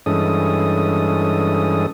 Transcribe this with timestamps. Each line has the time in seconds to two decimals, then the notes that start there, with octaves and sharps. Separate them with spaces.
0.06 G2 E3 G#3 C#4 A4 D#6